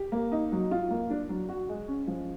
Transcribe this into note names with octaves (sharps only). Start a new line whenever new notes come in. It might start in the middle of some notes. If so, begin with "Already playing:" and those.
Already playing: G4
A#3
D#4
F#3
F4
A#3
D4
F#3
F#4
G#3
C#4
F3